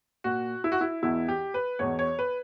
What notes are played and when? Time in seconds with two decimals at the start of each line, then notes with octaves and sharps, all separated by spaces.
0.24 A#2 F#4
0.64 E4
0.72 F#4
0.81 E4
1.03 E2 B2 E4
1.28 G4
1.54 B4
1.79 E2 B2 C#5
1.99 C#5
2.19 B4